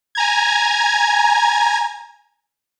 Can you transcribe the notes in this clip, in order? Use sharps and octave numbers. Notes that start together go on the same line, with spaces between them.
G#5 A#5 G#6